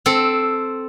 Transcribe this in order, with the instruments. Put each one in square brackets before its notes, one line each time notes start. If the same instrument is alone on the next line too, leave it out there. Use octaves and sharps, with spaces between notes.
[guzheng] C4 A4